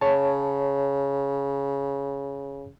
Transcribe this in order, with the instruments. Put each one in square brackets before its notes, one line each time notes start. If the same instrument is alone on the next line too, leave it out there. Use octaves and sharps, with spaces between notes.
[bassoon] C#3 [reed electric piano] C#5 A5